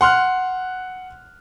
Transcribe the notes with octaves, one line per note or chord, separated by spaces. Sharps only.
F#5 C6 F6 F#6